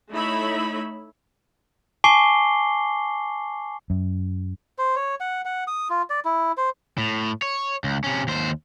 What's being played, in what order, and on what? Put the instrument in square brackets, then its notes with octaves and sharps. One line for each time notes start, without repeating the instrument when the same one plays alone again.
[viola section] A3 D#4 E4 C#5 E5 B5
[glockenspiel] G#5 A5 C#6 D6 C7 G7
[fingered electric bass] F#2
[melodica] C5
C#5
F#5
F#5
D#6
F4
D5
E4
C5
[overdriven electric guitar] A2
C#5
C#2
C3 C#4
D#2 C5